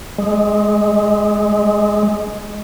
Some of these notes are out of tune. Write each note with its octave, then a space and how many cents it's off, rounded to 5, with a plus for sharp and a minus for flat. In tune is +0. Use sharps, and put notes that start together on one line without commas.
G#3 +5